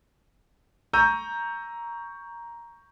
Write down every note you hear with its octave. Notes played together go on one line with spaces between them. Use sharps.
A#5 C#6 E6 G6 D#7